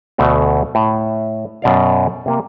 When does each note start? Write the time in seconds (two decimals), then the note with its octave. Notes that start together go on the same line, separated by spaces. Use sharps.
0.18 D2 B2 A3 F#4
0.75 A2
1.62 F#2 B2 D5 F5
2.26 C3 A#3